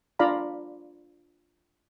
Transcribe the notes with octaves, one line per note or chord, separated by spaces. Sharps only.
D4 F4 D5 F5 A#5 B5